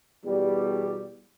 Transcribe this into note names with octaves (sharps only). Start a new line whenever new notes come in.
E2 B2 G3